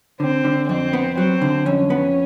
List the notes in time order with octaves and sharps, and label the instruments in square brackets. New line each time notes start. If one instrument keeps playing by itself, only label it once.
[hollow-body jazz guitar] D3 [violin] C4
[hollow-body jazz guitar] D3
[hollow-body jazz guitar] F2 [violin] C4
[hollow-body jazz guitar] B3
[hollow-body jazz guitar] F#3 [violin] C4
[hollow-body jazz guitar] D3
[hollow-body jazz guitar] F2 [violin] C#4
[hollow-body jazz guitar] B3